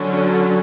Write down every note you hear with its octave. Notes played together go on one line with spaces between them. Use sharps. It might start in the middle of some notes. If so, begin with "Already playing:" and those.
Already playing: D3 F#3 C#4